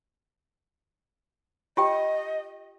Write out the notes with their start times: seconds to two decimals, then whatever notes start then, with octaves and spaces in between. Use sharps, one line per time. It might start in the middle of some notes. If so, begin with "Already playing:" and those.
1.77 F4 G4 D#5 G5